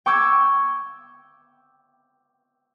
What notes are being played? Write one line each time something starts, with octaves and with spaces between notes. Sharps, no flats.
G5 C#6 D6 E6 G6 G#6